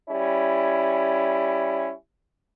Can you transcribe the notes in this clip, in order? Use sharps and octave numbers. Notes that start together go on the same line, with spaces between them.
G3 C#4 E4